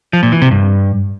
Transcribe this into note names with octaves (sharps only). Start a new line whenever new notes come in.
F3
A#2
E3
C3
G2